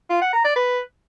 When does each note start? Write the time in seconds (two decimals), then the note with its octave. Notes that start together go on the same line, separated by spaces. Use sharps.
0.10 F4
0.22 F#5
0.33 A#5
0.45 D5
0.56 B4